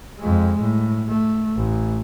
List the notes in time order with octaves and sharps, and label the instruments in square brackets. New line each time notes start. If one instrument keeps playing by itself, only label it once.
[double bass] F2 G#3
A2
A3
A1